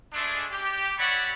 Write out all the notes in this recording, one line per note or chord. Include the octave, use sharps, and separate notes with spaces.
G#3 A3 D4
G4
C#5 D5 E5 F#5 B5 C#6